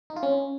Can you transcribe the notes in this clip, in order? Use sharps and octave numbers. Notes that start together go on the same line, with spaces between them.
D#4
F4
C#4